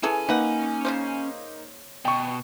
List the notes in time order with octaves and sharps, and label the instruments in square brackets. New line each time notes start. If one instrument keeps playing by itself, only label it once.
[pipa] E3 G#4 A4 [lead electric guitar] C#4 G#5
[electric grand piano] A#3 D#4 [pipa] B4 F#5
[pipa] C#3 G#3 C5
[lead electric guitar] B2 [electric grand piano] G5 C#6